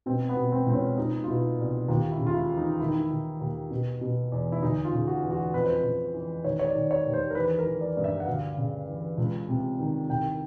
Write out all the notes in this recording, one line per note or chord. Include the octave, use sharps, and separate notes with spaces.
B2 C4
B3
B2
C4
C#2 C4
C#4
B2 D#4
F4
B2 E4
C2
D#2 F4
E4
C#3
F4
E4
E3
D#4
D#3 E4
D#4
E4
D#3
D#2
B2
B2
E2
E4
D2 D#4
F4
C#3
F#4
E3
F#4
F2 B4
C5
B4
C#3
E3
D#3 C#5
C#5
D5
D#3
C#5
D#2
C5
A#4
E3 B4
A#4
E3
D5
G2
E5
F#5
D2 F5
C#3
E3
C#2
C3
D#3
C2 G5